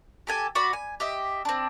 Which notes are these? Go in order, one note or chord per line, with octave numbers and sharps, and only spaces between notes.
G4 A4 G#5
F#4 D5 B5
G#5
G4 D#5 E5
C4 D4